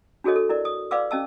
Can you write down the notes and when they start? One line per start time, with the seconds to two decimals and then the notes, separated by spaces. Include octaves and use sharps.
0.24 D4 F#4 G#4 A4 C#5 D#5
0.36 A4
0.49 E4 A#4 D5
0.65 D#6
0.91 B4 D5 F5 C6 D6 E6
1.11 C#4 D#5 A5 E6